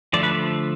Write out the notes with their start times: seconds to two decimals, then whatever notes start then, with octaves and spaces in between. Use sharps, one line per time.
0.13 D3 F3 A3 D5
0.23 B4